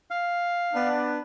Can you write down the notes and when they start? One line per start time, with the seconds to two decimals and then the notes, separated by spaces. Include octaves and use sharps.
0.11 F5
0.73 B3 D4